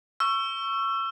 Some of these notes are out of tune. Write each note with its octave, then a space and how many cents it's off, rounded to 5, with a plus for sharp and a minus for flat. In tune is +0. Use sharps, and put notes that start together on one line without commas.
C#6 +0 E6 +30